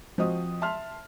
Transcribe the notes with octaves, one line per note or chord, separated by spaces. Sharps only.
F3 C4 F#4 D#5 D#6
E5 A5 C6 F6